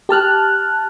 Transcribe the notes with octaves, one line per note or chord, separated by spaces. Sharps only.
G4 A5 F6 F#6